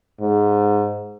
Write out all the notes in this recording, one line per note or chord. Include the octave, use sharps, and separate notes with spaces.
G#2